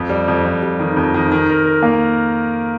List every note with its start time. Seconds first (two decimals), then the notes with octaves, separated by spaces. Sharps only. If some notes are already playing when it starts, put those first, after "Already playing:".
Already playing: F2
0.10 G3
0.28 F2
0.45 F2
0.62 G3
0.79 D#3
0.97 F2
1.14 D#3
1.32 D#3
1.49 A#4
1.65 A#4
1.83 A#3